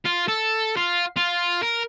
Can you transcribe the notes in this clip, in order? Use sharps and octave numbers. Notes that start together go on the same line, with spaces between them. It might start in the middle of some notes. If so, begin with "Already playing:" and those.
F4
A4
F4
F4
A#4